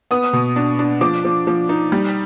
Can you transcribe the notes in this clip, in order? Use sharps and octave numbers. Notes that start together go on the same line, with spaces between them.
B3 D#6
B2
D4
D4
F3 D6
F3
F3
D#4
G3